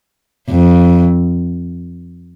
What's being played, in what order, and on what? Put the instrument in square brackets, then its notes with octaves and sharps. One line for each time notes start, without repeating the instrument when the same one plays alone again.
[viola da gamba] F2